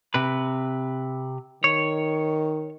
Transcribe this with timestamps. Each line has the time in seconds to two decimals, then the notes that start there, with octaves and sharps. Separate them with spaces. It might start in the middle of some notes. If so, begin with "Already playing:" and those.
0.14 C3 B4
1.64 D#3 C#5